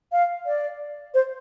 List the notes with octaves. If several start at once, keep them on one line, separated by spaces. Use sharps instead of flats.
F5
D5
C5